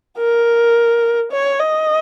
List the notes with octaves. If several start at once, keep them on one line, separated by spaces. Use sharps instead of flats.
A#4
C#5
D#5